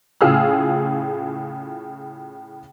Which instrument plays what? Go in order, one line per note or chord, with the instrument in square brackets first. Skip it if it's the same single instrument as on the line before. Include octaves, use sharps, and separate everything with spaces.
[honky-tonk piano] A2 C#3 F4 G#4 E6 F6